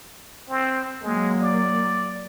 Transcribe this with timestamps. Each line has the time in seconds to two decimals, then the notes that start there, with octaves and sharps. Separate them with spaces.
0.49 C4
1.03 F#3 G#3 A#3
1.41 D5